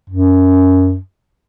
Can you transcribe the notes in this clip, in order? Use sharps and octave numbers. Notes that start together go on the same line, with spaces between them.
F#2